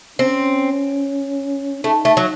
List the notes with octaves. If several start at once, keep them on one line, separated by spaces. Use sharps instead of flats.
C4 C#4
A3 D#4
A3
F#3